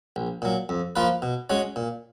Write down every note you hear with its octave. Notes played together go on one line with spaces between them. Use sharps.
A#1
A#2 F#3
F2
F3 A#3 F4 B4
B2
G#3 C#4 F#4 C#5
A#2